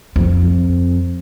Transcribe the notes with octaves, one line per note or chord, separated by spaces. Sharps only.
F2